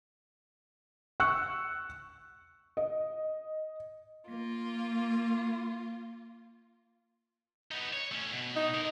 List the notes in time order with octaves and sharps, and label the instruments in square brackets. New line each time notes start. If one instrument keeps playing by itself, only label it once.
[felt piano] C#6 E6 F#6 C#7
D#5
[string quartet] A#3 F4
[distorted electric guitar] B3 D#4
C#5
A3 C#4
B2
[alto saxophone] D#4
[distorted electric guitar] D3 A#4